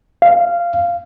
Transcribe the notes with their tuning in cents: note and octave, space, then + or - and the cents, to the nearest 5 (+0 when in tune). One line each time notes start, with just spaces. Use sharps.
F5 -15